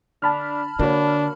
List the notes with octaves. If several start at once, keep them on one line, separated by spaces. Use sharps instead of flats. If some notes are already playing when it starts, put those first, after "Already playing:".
D3 D4 A5 B5 F6
D3 A#3 D4 F#4 C#5